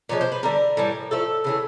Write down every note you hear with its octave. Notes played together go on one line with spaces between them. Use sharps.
A#2 F3 G#3 C#5
C5
B4
D3 G3 A#4
A2 E3 G3
A2 F3 A3 A4
C#3 E3 A3